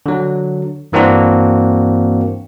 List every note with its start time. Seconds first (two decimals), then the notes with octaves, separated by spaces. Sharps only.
0.06 D3 F#3
0.92 G2 E3 A#3 C4 D4 F#4